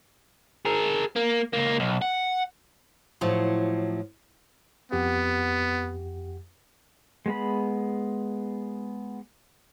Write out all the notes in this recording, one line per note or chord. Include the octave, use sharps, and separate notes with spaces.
G#4 A#4
A#3
C#2 A#3
B1
F#5
A2 F3 F#3
F2 B3 G4 F#5
G#3 B3 B5